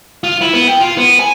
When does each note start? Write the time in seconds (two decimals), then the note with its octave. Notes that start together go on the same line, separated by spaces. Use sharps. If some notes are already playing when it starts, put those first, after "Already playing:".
0.24 F4
0.42 E4
0.54 B3
0.68 G5
0.80 F4
0.97 B3
1.19 G#5